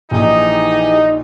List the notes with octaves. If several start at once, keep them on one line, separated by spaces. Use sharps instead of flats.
A#1 E3 D#4 G4 G#4